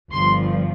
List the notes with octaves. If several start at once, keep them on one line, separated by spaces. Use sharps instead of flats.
G1 G2 F3 C6